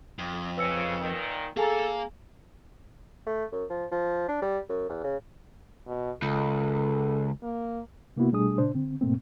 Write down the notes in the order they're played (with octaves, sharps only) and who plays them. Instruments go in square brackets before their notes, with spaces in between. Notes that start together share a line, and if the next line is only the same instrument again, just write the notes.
[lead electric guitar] F2
[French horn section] C#3 [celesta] B4 E6 C#7
[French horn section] A#2 D#3
[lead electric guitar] A#3 F5 [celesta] G#4 G#5 A#5 [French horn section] A4
[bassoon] A3
F#2
F3
F3
D4
G3
F#2
E2
C#3
[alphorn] B2
[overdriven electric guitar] C#2 [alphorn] A4
[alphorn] A#3
[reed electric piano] C3 A#3 B3 E4 F#4
B2 G3 A3 D4 G#4 D#6
A#2 C#3 D4 C5
D3 C4
G#2 B2 A3 A#3 C4